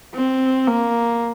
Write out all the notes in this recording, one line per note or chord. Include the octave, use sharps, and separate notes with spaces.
C4
A#3